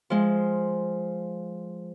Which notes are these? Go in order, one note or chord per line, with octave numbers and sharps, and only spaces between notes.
F3 G#3